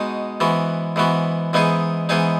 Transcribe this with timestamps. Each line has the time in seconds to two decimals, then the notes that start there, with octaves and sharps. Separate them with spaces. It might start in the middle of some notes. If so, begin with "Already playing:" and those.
Already playing: B2 G#3 D#4 F#4
0.40 G#2 E3 B3 F#4
0.96 G#2 E3 B3 F#4
1.53 G#2 E3 B3 D#4 G#4
2.09 G#2 E3 B3 D#4 G#4